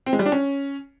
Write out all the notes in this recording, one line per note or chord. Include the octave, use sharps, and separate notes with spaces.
C4
G#3
G3
D4
C#4